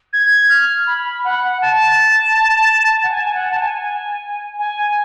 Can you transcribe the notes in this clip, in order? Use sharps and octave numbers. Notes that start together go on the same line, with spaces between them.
G#6
F6
B5
F#5
A5
F#5
G#5
G#5
F#5
A5
G#5
G#5